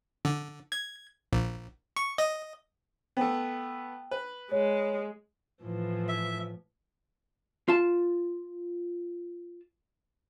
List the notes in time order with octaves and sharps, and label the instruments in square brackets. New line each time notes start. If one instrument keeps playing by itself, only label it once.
[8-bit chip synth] D3
G#6
A#1
C#6
D#5
[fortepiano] A3 B3 [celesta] G5
[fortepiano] B4
[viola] G#3 [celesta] C#5
[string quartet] A2 E3 F3
[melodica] E5
[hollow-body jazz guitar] F4 A5